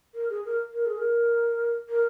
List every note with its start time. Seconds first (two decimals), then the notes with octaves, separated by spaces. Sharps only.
0.14 A#4
0.30 G#4
0.45 A#4
0.73 A#4
0.86 G#4
0.98 A#4
1.89 A#4